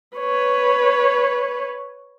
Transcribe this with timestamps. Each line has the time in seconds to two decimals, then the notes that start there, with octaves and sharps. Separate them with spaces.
0.17 B4 C#5